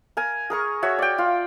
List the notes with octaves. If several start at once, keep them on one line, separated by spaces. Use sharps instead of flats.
A#4 G#5
G#4 A#4 C#6
F#4 C#5 E5
D5 G5
F4